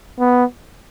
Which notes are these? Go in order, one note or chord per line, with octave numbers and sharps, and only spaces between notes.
B3